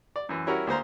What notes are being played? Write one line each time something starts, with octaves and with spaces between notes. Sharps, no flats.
D5
F#2 E3
G3 C#4 E4 F#4 A#4 C#5
D2 A#3 C5 A#5